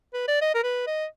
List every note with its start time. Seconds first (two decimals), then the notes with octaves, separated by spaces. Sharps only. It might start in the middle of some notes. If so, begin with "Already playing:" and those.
0.14 B4
0.28 D5
0.42 D#5
0.55 A#4
0.63 B4
0.87 D#5